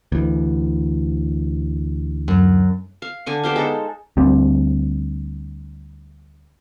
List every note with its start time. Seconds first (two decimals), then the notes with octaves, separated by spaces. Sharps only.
0.12 D2 E3
2.28 F#2
3.02 F5
3.26 D3 G#5 C#6
3.43 B3 G4 C5 F5
3.56 G#3 D#4 A4 C5
4.17 D2 G3 C4